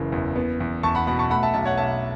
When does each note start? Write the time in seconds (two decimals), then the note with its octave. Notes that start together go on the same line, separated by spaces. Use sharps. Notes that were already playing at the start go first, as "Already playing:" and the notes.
Already playing: F#1 C#3 E3
0.12 E2
0.36 B3
0.60 E2
0.83 E2 A5 C#6
0.95 F#5 B5
1.07 B2 F#5 B5
1.19 A5 C#6
1.30 A3 F#5 B5
1.43 E5 A5
1.54 B1 E5 A5
1.65 C#5 F#5
1.78 B1 E5 A5